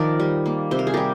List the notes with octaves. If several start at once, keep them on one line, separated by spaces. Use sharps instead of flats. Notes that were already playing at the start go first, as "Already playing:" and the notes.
Already playing: D#3 F3 A#4 D5
G3
A#3
C3 C5
A#4
G#4
G3 G4 A#4